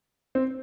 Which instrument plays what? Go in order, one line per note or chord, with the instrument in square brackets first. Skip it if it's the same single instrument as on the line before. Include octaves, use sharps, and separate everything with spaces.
[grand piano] C4